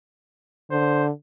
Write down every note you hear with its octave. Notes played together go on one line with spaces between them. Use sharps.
D3 C5